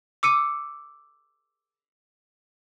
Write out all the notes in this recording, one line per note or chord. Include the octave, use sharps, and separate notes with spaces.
D6 E6 C#7 D#7